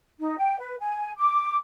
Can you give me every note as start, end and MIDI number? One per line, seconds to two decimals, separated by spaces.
0.19 0.35 63
0.38 0.57 79
0.58 0.75 71
0.80 1.11 80
1.18 1.55 86